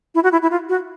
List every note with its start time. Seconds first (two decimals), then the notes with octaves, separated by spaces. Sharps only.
0.15 E4
0.23 F#4
0.32 E4
0.42 E4
0.51 F4
0.69 F#4